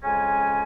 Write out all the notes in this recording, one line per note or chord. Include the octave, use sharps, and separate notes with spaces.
F2 C#3 G#3 C#4 G#5